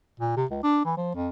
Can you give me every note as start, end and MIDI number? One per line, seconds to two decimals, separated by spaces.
0.20 0.33 46
0.37 0.45 48
0.51 0.62 37
0.63 0.82 62
0.85 0.92 52
0.97 1.14 53
1.15 1.30 41